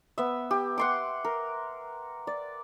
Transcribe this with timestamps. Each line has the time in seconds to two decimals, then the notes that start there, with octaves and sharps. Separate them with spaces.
0.18 B3 E5
0.51 G4
0.78 F#5 C6 D6
1.25 A#4
2.27 D5